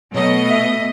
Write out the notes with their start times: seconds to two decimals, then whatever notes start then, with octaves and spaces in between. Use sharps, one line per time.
0.14 B2 F#3 A3 D#5
0.50 E5